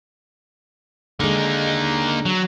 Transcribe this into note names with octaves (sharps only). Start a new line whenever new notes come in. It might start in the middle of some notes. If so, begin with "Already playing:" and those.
D3 G#3 A#3 D#4
F#3